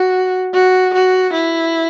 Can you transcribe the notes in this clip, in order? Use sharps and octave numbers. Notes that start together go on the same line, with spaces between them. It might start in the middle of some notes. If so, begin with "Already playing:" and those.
Already playing: F#4
F#4
F#4
E4